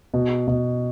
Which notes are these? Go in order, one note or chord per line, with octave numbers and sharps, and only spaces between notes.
B2
B2